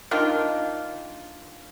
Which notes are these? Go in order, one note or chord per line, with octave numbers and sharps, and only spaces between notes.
D#3 A#3 D4 F4